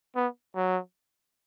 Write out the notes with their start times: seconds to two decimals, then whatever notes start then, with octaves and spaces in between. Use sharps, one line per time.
0.16 B3
0.55 F#3